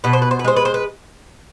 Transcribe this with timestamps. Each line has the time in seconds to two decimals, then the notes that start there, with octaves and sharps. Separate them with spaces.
0.04 B2 B4
0.13 C5
0.22 B4
0.31 C5
0.39 B4
0.44 G#3 C5
0.56 B4
0.65 C5
0.74 B4